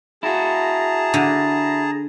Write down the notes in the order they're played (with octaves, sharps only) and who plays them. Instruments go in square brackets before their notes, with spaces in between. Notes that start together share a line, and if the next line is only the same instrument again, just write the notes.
[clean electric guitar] E4 F#4 [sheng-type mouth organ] G#4 A5 A#5
[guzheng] D3